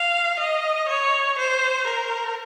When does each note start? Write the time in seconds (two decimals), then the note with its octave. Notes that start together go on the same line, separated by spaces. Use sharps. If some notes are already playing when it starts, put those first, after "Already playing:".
Already playing: F5
0.39 D#5
0.88 C#5
1.38 C5
1.87 A#4